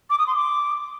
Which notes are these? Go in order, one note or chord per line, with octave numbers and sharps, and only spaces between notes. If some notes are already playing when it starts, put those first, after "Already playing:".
D6
D#6
C6
D6